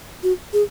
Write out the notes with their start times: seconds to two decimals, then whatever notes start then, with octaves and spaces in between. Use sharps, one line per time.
0.23 F#4
0.53 G#4